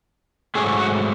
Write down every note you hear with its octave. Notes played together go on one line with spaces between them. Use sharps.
G#2 F#3 A3 G#4
F#4